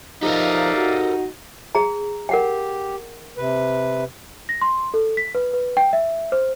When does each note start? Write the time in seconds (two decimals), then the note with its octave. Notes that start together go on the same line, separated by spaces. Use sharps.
0.23 F3 D#4 G4 A4 A#4 D5 E5 F5
0.76 F#4
1.75 G#4 A#5
2.29 G4 A#4 F#5 G5
3.37 C3 B4
4.49 A#6
4.62 C6
4.94 A4
5.17 B6
5.35 B4
5.53 B4
5.77 G5
5.93 E5
6.32 C5